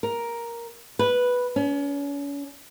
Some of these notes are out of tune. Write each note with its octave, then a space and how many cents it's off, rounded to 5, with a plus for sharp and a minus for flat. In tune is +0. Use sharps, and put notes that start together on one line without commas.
A#4 +5
B4 -5
C#4 +35